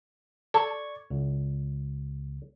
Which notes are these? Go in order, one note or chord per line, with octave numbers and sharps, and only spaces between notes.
A4 D5 C#6 G#6
C#2